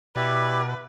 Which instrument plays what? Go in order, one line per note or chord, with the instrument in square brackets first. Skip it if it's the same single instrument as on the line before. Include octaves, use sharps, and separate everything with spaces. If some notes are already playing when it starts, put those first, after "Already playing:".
[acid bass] B2 [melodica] E4 G4 D5 [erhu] B4